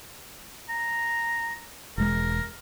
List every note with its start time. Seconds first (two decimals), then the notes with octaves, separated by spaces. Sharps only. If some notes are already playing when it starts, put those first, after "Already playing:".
0.69 A#5
1.98 E1 G#3 A#4